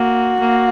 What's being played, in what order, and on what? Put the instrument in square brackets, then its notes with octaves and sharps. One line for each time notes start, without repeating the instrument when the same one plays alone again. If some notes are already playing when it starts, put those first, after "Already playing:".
Already playing: [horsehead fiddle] A#3 [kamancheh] F#4
[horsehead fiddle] A#3